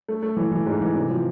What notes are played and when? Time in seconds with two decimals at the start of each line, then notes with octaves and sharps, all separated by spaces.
0.08 A3
0.23 A3
0.37 E3
0.52 E3
0.66 G#2
0.81 E3
0.95 C3
1.10 F3